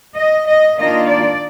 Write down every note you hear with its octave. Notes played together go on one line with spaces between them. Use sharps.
D#5
D#5
D#3 A#3 D4 F4 D#5
D5